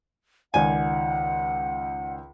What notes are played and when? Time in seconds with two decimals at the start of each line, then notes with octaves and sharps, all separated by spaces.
0.54 C#2 D#3 D5 F#5 G#5